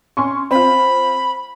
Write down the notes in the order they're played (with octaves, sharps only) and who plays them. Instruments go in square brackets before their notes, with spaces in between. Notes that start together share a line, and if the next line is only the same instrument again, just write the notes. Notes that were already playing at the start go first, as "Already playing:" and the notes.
[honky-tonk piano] C#4 C6 C#6
[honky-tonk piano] C4 F4 [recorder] B5